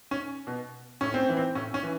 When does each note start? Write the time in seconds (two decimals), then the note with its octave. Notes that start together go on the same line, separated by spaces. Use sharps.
0.11 C#4
0.47 B2
1.01 A2 C#4
1.14 C4
1.29 E3
1.37 C4
1.55 A2 C#4
1.74 C#4
1.83 E3